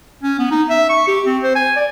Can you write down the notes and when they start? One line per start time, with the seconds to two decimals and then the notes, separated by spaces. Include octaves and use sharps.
0.23 C#4
0.39 B3
0.51 D#4
0.69 E5
0.90 C#6
1.07 G4
1.26 C4
1.43 C5
1.55 G#5
1.76 D5